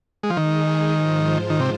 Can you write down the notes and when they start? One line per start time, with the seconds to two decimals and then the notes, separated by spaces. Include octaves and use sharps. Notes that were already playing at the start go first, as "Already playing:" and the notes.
0.23 G#3
0.30 F3
0.37 D#3 G#3 D#4 G#4
0.93 G#2 F3 G#3 F4 C5
1.50 D#3
1.60 C3